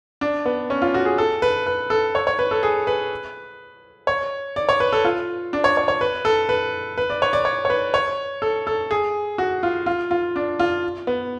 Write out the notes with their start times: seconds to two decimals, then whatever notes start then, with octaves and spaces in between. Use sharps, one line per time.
0.21 D4
0.45 B3
0.70 C#4
0.82 F4
0.94 F#4
1.05 G#4
1.18 A4
1.42 B4
1.66 B4
1.90 A4
2.15 C#5
2.27 C#5
2.39 B4
2.51 A4
2.63 G#4
2.87 B4
4.07 C#5
4.56 D5
4.69 C#5
4.80 B4
4.93 A4
5.04 F4
5.53 D4
5.64 C#5
5.77 C#5
5.88 C#5
6.01 B4
6.25 A4
6.49 B4
6.98 B4
7.10 D5
7.22 C#5
7.33 D5
7.45 C#5
7.65 C#5
7.70 B4
7.94 C#5
8.42 A4
8.67 A4
8.91 G#4
9.38 F#4
9.63 F4
9.86 F4
10.11 F4
10.36 D4
10.59 F4
11.07 B3